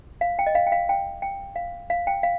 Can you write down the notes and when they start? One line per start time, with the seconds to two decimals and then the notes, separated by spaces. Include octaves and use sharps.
0.21 F5
0.39 G5
0.46 D#5
0.55 F5
0.67 G5
0.72 F5
0.89 G5
1.22 G5
1.56 F5
1.90 F5
2.07 G5
2.23 F5